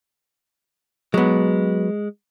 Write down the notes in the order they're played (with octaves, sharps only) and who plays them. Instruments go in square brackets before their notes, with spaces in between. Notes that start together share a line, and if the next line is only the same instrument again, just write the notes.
[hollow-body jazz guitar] F#3 B3 [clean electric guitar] G#3